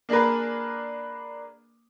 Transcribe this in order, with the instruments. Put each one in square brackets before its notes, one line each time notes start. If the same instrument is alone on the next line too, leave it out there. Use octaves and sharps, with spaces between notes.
[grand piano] A#3 D4 G#4 A#4 B4